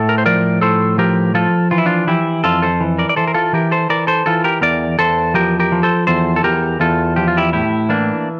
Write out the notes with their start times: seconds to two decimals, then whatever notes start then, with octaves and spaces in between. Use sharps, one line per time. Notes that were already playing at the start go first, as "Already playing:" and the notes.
Already playing: A2 A4
0.09 A#4
0.18 C5
0.26 F3 A#4 D5
0.61 A2 A4 C5
0.98 F3 G4 A#4
1.34 F3 F4 A4
1.71 E3 F4
1.78 E4
1.86 D4 F4
2.07 E3 E4 G4
2.44 F2 F4 A4
2.62 A4 C5
2.80 E3
2.98 A#4 D5
3.09 D5
3.16 E3 A4 C5
3.27 A#4
3.34 F4 A4
3.53 E3 G4 A#4
3.71 A4 C5
3.90 E3 A#4 D5
4.07 A4 C5
4.26 E3 F4 A4
4.44 G4 A#4
4.61 E2 A#4 D5
4.99 E2 A4 C5
5.34 F3 G4 A#4
5.60 G4 A#4
5.72 F3
5.83 A4 C5
6.07 E2 A4 C5
6.36 A4
6.44 E2 G4 A#4
6.80 E2 F4 A4
7.16 F3 G4
7.28 F4
7.37 E4 G4
7.53 A2 E4 G4
7.89 E3 A#3 D4